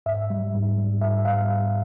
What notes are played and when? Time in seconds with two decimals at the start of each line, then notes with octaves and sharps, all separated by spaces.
0.06 G#2 E5
0.30 G3
0.54 G#2
0.78 G3
1.01 G#2 E5
1.25 G3 F5